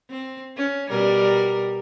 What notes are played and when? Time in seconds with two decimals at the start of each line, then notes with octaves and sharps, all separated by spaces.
0.10 C4
0.57 C#4
0.90 B2 G3 A#4